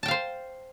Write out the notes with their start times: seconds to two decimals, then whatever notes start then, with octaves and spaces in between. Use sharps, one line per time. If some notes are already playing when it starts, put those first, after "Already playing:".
0.03 A5
0.06 G5
0.08 F5
0.11 C5